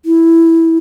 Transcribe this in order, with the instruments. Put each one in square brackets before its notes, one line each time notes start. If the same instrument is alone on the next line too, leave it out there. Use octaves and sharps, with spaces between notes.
[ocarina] E4